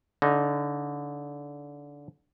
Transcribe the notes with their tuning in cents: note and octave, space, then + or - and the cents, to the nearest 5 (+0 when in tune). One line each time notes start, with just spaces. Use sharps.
D3 -25 D#4 +0